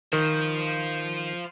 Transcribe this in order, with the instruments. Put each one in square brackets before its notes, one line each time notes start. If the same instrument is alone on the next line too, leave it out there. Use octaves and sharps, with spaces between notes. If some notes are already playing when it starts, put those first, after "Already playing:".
[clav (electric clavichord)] D#3 [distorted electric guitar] F4 C5